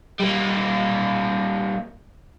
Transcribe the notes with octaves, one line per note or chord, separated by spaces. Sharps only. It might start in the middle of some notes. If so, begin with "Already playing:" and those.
G3 A#3